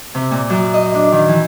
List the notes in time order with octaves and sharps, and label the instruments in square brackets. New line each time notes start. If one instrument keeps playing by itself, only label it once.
[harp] C3
A#2
F#2
D#5
D4
D#3
E3